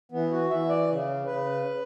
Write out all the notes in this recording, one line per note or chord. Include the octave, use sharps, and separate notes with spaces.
E3 B3
F#4
E3 E5
D5
C#3
C#3 B4